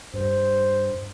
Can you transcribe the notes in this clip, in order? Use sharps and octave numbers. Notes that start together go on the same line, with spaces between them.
G2 C5